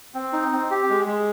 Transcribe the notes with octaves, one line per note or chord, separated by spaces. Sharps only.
C4
D#4
C4
G4
G#3
G#3